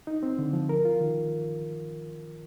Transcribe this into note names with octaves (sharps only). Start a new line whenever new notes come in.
D#4
C4
D3
F3
A#4
F4
D#3